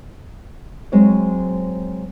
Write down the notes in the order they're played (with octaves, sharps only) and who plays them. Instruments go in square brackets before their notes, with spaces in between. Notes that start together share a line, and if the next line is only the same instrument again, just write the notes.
[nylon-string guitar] F#3 G#3 C4 F#4 C5 C#5